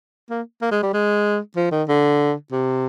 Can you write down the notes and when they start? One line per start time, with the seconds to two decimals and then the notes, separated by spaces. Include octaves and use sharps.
0.30 A#3
0.62 A#3
0.71 G#3
0.83 G3
0.94 G#3
1.56 F3
1.72 D#3
1.89 D3
2.52 C3